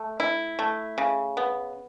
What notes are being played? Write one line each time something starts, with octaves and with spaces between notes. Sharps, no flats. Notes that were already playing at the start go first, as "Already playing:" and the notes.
Already playing: A3
E4
A3
C#3
B3